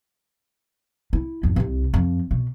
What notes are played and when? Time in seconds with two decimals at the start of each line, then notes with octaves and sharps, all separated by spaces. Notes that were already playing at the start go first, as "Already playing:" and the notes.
1.13 E4
1.43 G#1 F2
1.56 C2 C3
1.94 F2
2.31 B2